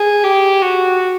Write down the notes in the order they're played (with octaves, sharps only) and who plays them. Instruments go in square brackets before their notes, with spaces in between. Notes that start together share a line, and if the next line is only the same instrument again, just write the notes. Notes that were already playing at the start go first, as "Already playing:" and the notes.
Already playing: [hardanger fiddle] G#4
G4
F#4